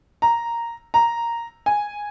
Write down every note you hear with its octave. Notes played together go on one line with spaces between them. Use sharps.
A#5
A#5
G#5